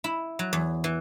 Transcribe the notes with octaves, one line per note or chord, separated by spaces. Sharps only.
E4
F#3
E2
E3